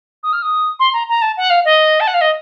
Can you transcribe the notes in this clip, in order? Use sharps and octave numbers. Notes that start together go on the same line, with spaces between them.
D#6
F6
D#6
C6
A#5
A#5
A5
F#5
F5
D#5
A5
F#5
F5
D#5